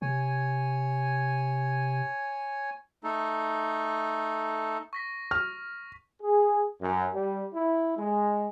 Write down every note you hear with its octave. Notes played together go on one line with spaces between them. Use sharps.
C3 C#5 G#5
A3 D#4 A4
C#6 A#6 B6
C#6 F6
G#4
F#2
G3
E4
G#3